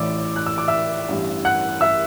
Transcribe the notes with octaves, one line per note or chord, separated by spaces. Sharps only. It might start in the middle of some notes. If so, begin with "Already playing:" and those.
Already playing: A1 A2 E3 D5 D6 E6
F#6
E6
D6
E5 E6
A1 G2 E3
F#5 F#6
E5 E6